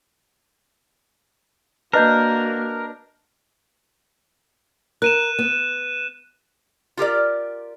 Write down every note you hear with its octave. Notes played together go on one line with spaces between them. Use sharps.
A#3 D4 F#4 A#4 B4 D#5 G6
A#4 F#6 D#7 E7
B3
F4 G4 A#4 D5